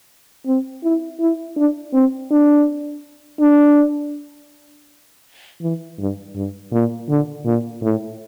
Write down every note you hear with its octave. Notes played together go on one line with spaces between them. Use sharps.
C4
E4
E4
D4
C4
D4
D4
E3
G2
G2
A#2
D3
A#2
A2